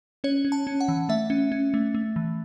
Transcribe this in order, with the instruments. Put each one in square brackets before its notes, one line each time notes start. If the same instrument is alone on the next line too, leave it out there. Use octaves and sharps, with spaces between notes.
[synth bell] C#4 C#5
C#4
A5
C#4
F#5
E3
A3 E5
C#4
C#4
A3
A3
E3